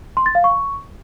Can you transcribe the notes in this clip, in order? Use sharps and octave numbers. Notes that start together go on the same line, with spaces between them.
C6
A6
F5
C#6